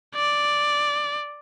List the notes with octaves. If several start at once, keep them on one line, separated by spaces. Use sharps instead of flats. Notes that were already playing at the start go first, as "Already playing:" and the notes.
D5